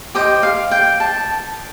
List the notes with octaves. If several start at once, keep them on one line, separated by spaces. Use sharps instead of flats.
G4 C5 D#5 G5
F5
G5
A5